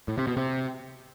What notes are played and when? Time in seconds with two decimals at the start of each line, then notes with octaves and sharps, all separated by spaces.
0.08 A2
0.18 C3
0.27 B2
0.37 C3